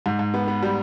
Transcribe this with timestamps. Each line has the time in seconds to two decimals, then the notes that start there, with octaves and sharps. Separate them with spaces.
0.06 G#2
0.19 G#2
0.34 B3
0.48 B3
0.62 G3